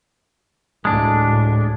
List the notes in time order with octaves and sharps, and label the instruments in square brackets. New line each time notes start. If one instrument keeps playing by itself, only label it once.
[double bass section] D2 A2 [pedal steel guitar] G#3 D4